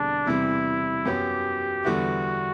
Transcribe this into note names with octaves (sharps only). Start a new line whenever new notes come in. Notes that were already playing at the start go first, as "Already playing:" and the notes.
Already playing: E1 E2 D3 G3 C4 D4
E2 C3 E3 G3 C4 E4
F#2 F#3 B3 G4
E2 D3 G3 B3 E4 F#4